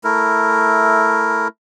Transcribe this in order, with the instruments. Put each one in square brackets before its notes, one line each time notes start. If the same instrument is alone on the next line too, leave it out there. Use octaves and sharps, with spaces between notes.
[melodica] A3 E4 A#4